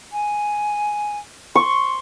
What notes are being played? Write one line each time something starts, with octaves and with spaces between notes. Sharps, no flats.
G#5
C6 C#6